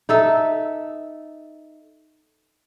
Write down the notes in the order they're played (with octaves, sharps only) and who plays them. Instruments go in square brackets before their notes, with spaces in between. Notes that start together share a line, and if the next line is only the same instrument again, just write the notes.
[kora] D#4 A4 E5